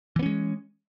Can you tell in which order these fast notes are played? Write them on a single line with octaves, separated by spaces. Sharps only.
E3 B3 C#4 G#3